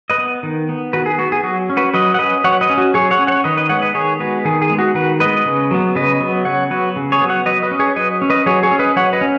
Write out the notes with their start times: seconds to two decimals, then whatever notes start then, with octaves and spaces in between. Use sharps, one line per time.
0.10 B4 D#5
0.18 B3
0.43 D#3
0.69 B3
0.93 D#3 F#4 B4
1.06 G#4
1.19 B3 F#4
1.32 G#4
1.43 F#3 F#4
1.70 C#4
1.77 F#4 B4
1.94 F#3 B4 D#5
2.14 F#5
2.19 C#4 B4 D#5
2.44 F#3 C#5 F#5
2.61 B4 D#5
2.70 C#4
2.78 F#4
2.94 F#3 G#4 C#5
3.11 C#5 F#5
3.19 C#4
3.27 C#5 F#5
3.44 D#3 B4 D#5
3.57 B4 D#5
3.69 G#3 B3 C#5 F#5
3.82 B4 D#5
3.94 D#3 G#4 C#5
4.20 G#3 B3 F#4 B4
4.45 D#3 G#4
4.62 G#4
4.70 G#3 B3
4.79 F#4
4.95 D#3 F#4 B4
5.20 G#3 B3 B4 D#5
5.45 C#3
5.71 F#3 B3
5.95 C#3 B4 D#5
6.21 F#3 B3
6.45 C#3 C#5 F#5
6.70 F#3 B3 F#4 B4
6.96 C#3
7.12 G#4 C#5
7.21 F#3 B3
7.29 C#5 F#5
7.45 F#3 B4 D#5
7.62 B4 D#5
7.71 C#4
7.79 G#4 C#5
7.96 F#3 B4 D#5
8.22 C#4
8.30 B4 D#5
8.46 F#3 G#4 C#5
8.63 G#4 C#5
8.71 C#4
8.79 B4 D#5
8.96 F#3 C#5 F#5
9.13 B4 D#5
9.21 C#4